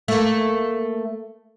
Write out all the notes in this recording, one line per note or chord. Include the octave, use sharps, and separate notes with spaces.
A3 A#3